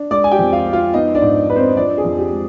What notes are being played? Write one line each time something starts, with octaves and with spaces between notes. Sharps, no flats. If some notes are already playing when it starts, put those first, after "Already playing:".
Already playing: D4
G#3 D5 D6
G#5
G4 G5
F2
F4 F5
C4
F4 F5
B3 D#4 D#5
D4 D5
G#2
D4 B4
C4 C5
F3 D4 D5
G#4
F2
G4
G#3